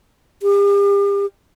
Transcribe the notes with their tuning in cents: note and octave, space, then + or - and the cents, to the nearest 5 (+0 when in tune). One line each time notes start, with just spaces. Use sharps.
G4 +40